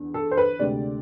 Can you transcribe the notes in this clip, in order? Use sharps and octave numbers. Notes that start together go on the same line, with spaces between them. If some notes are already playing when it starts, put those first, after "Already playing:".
Already playing: E2 D3
A4
C5
B4
D2 C3 G#3 D5